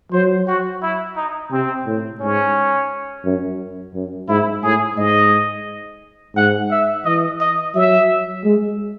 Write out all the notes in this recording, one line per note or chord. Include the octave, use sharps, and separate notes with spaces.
F#3 C5
F#4
E4
D#4
C3 C4
A2
G#2 C#4
F#2
F#2
G#2 E4
A2 G#4
G#2 D#5
G#2 F#5
E5
E3 D#5
D#5
F#3 E5
G#3